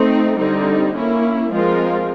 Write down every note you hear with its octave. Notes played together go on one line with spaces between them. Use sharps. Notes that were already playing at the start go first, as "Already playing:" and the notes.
Already playing: A3 C4 D#4
D3 G3 C4 D#4
A#3 C#4 E4
F3 G#3 C4 F4 A#4